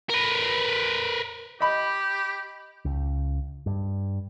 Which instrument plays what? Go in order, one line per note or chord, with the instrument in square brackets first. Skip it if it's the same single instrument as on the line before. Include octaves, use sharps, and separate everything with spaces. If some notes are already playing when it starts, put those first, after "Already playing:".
[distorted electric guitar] A#4 B4
[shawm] G4 [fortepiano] D#5 B5
[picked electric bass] C#2
G2